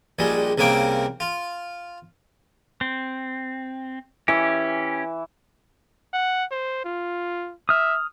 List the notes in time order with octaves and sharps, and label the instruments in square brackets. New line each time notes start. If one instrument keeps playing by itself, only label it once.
[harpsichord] A#1 G3 G#3
C2 C#3 A#3 C4 D6
F4
[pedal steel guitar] C4
[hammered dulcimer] E3 E5 [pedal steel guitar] C#4 G4
[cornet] F#5
C5
F4
[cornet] E5 [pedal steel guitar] D#6 F6